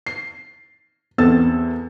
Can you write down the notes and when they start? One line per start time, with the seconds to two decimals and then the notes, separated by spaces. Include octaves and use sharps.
0.07 C7
1.18 E2 B3 C4 A4 E6 A6